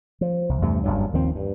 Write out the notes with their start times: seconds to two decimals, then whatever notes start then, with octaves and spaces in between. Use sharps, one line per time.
0.21 F3
0.49 C2
0.61 E2 G2 C3 A3
0.84 F#1 C#2 G2 F#3
1.13 D#2 D#3 F3 C4
1.35 G2